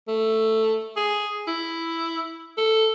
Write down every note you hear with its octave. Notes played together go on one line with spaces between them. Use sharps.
A3
G#4
E4
A4